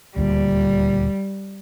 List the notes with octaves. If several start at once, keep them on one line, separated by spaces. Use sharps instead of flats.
D#1 D2 A#2 G3